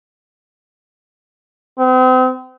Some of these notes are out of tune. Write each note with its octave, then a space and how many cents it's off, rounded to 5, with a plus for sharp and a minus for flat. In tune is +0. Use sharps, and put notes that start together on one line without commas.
C4 -40